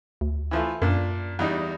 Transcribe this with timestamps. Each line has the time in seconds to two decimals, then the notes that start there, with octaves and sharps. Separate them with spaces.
0.21 D2
0.51 E3 F3 A3
0.82 F#2 A#2 D4
1.39 E2 G3 D#4